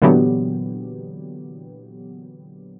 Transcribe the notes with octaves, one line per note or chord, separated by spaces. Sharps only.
A#2 D3 E3 F#3 B3 G4